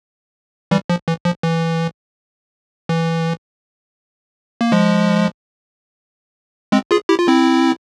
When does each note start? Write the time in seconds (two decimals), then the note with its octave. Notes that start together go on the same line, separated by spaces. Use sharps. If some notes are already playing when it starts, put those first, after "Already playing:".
0.71 E3 G3
0.90 F3
1.08 E3
1.25 F3
1.43 E3
2.89 E3
4.61 A#3
4.72 F3 G#3
6.72 G#3 C4
6.91 F4 G#4
7.09 E4 G4
7.19 F4
7.28 C4 E4